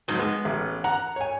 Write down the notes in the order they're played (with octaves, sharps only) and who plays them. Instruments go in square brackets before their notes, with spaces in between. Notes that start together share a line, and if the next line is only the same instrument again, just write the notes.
[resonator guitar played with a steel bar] F2 G#2 F#3
[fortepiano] G#3 [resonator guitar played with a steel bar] B3
[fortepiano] A1
[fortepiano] F#5 [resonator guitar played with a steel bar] A#5
[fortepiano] C#5 G#5